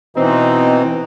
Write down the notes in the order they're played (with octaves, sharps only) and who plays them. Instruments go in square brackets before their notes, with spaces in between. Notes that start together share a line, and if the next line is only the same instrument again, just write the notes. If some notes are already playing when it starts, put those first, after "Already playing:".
[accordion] B2 E3 [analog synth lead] C4 [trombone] D#4